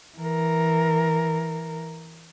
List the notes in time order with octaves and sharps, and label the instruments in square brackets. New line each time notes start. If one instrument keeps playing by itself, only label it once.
[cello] E3 A#4